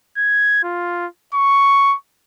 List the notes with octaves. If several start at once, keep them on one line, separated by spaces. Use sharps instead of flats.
G#6
F4
C#6